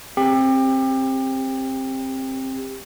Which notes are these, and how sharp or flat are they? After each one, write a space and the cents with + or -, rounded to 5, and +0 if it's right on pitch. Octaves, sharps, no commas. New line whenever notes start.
C4 +20 G4 +25